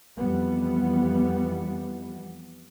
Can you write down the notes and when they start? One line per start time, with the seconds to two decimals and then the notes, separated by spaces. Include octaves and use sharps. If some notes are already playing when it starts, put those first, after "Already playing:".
0.17 F2 E3 G3 B3